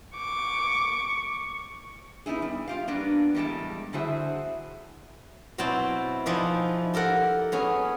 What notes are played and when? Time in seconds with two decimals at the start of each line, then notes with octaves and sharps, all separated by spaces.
0.17 C#6 D6
2.26 B3 D#4 E4 G#4
2.42 G3
2.68 F4 G4 F5
2.88 G3 A#3 B3 D4
3.35 E2 A2 G3 G#3 G5 A5
3.93 D3 E4 F#4 G#4 C5 E5
5.58 B2 F#3 C4 E4 G5 A5
6.26 F3 D#4 E4 G#4 B4 D5
6.94 G4 A4 A#4 F#5
7.52 B3 C#4 G#4